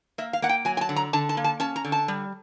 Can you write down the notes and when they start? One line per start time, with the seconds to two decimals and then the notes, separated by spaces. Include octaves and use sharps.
0.18 A#3 E5
0.33 F5
0.42 A#3 F#5
0.49 G5
0.65 F#3 G#5
0.77 G#5
0.81 A5
0.89 D3
0.96 A#5
1.13 D3 A5
1.29 A5
1.37 A#3
1.44 A5
1.60 C#4 A5
1.76 A#5
1.85 D3
1.92 A5
2.08 G3